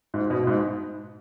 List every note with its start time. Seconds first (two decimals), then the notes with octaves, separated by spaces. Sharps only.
0.14 G#2
0.30 B2
0.47 G#2